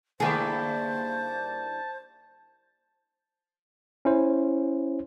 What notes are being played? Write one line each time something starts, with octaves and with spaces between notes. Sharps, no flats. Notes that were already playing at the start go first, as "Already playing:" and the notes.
G2 D3 A#3 E4 G#4 C5 A5
C#4 E4 C5